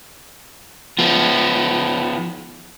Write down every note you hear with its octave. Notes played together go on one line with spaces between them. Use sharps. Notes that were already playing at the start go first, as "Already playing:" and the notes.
F3 B3